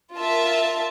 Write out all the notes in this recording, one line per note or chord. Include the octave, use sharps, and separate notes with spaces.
F4 A#4 E5 A5